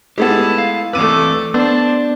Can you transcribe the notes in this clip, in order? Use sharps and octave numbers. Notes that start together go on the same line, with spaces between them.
G#3 A3 B3 E4 G4 A4 A5
F5
E3 A3 C4 B4 D6 E6 D#7
B3 D4 C5 D5 A5